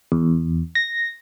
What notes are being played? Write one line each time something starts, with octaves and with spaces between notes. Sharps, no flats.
E2
A#6